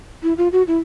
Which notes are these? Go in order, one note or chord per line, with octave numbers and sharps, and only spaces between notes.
E4
F4
F#4
E4